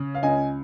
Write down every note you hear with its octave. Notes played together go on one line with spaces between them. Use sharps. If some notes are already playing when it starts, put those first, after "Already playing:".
Already playing: C#3
F5
C#2 D#5 G#5